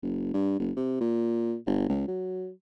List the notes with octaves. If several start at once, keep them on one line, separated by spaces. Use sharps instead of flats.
F#1
G2
F#1
C3
A#2
G1
C#2
F#3